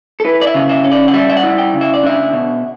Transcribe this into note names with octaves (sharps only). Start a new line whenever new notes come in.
A4
E4 B4
D5
E5
C#3
E5
C#4
D5
F#5
G3 E5
E5
F#5
E4
G5
C#3
E5
D5
D4 E5
B2